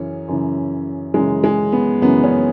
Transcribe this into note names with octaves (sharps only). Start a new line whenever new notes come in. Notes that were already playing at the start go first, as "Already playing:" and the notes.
Already playing: F#2 C#3 E3 C#4
F#2 C#3 E3
F#2 C#3 E3 G#3
G#3
B3
F#2 C#3 E3 B3
C#4